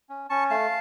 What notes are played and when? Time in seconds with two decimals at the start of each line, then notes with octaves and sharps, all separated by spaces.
0.09 C#4
0.30 C#4 A5 C#6
0.50 A3 F5 A5